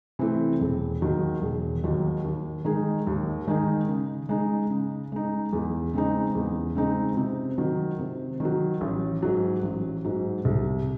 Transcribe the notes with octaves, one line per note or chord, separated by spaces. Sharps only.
C3 E3 A3 C4
E1
D#2 D#3 F#3
E1
D#2 D#3 F#3
D#2
D#3 G#3 D#4 G#4
D#2
D#3 G#3 D#4 G#4
C#3
G#3 D#4
C#3
G#3 D#4
E2
C#3 G#3 C4 D#4
E2
C#3 G#3 C4 D#4
C3
D#3 F#3
C3
D#3 F#3
A1
G#2 F#3
A1
G#2 F#3
C2